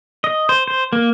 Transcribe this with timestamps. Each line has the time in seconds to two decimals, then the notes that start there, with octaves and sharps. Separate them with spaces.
0.24 D#5
0.49 C5
0.68 C5
0.93 A#3